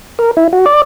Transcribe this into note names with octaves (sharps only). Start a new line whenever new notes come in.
A#4
E4
F#4
D5